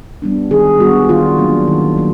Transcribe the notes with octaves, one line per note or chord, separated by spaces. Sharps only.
G3 B3 D4
D#3 G#4
G3 B3 D4 F#4
D#3 F4
F#3 A#3 D4
D#3
F#3 A#3